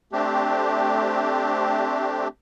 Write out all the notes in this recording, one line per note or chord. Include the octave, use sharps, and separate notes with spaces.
A3 C4 D4 G4